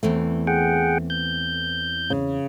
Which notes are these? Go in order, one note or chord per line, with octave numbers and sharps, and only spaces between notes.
E2 E3 A3 C4
G#4 F#5 G5
G6
C#3